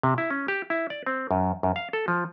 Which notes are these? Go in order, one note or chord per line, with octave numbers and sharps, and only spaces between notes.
C3
E4
C#4
G4
E4
D5
C4
F#2
F#2
F5
A4
F3